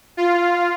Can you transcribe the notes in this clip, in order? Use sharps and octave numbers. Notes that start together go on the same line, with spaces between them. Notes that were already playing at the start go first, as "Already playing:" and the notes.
F4